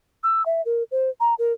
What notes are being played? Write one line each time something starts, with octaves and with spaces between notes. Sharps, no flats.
E6
E5
A#4
C5
A#5
A#4